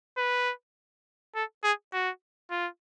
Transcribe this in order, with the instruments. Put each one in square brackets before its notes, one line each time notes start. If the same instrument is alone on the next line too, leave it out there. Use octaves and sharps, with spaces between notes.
[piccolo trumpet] B4
A4
G#4
F#4
F4